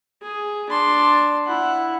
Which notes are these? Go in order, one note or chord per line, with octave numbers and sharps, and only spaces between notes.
G#4
D4 C6
E4 F#5